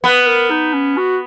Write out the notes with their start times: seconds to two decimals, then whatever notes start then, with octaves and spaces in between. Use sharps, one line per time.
0.04 B3 B4
0.27 A#4
0.50 D#4
0.73 C#4
0.97 F#4